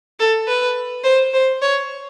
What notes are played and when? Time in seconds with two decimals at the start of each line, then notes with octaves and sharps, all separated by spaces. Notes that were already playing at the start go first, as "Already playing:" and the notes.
0.20 A4
0.48 B4
1.04 C5
1.33 C5
1.62 C#5